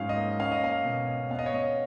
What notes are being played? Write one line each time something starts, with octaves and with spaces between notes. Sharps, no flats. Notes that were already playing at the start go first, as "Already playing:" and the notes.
Already playing: G#2 F#3 C#4 F5
D#5
A#3
C#4 F5
D#5
A#3 F5
B2
C#4
B3 F5
D#5
C#5
B3 D#5